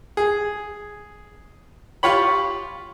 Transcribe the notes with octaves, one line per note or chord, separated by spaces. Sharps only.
G#4
F4 G4 C#5 B5